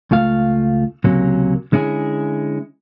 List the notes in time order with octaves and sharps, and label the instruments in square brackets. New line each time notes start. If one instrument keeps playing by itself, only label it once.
[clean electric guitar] C#2 A3 F4 F5
C#2 C3 F#3 A#3 C#4
D3 G#3 C#4 E4 G#4